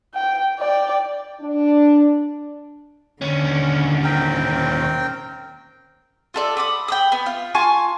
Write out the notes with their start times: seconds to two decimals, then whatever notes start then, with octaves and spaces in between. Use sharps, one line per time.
0.14 G5
0.59 D5 G5
1.41 D4
3.22 D#2 D3 C#4
4.04 C4 A#4 G5
6.34 F4 A4 D5
6.57 B5 D6 D#6
6.88 G5 B5 D#6
7.12 B3
7.26 F4
7.54 F4 G#5 A5 C#6